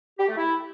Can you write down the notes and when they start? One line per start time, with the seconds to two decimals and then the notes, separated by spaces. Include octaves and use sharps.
0.19 G4
0.28 A3
0.37 E4